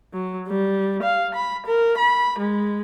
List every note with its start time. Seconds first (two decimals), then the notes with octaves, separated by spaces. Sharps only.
0.13 F#3
0.48 G3
1.03 F5
1.35 B5
1.67 A#4
1.98 B5
2.39 G#3